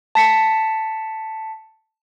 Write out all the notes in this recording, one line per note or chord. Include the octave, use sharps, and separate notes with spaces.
A5 B6 C#7